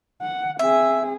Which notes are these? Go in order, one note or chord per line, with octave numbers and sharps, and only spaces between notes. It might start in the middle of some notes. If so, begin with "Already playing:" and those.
F#5
C4 G#4 E5